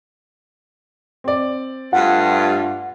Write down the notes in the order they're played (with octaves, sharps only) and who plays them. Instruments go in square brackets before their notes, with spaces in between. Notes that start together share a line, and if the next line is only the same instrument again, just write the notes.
[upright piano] C4 D5
[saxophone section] G2 [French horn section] A3 F4 [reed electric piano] F#5